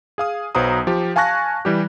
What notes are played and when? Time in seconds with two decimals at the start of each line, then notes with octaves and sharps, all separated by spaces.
0.18 G#4 F5 D#6
0.55 B1 F#3 B4 C5 A#5 D#6
0.87 F3 G4
1.16 F5 G#5 A5 C#6 F#6 A#6
1.65 E3 G3 G4